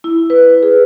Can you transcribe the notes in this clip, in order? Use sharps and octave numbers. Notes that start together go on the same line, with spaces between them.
E4
B4
G#4